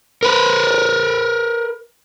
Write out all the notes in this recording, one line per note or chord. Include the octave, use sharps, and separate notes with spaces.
A#4 B4